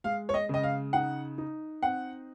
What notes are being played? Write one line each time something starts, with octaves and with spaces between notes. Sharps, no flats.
G#3 F5
C#5
D#5
C#3 D#5
F5
D#4 F#5
D#4
C4 F#5